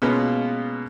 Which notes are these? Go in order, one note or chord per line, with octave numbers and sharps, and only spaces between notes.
B2 G#3 A#3 B3 C#4 F4